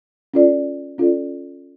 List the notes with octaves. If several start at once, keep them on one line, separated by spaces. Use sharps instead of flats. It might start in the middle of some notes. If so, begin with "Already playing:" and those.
C#4 F4 A4 D5
C#4 F4 A4 D5